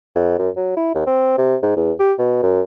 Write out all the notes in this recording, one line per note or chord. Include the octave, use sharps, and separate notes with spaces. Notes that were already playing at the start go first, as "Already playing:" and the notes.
F2
F#2
F#3
E4
D#2
C4
C3
G#2
E2
G4
B2
F#2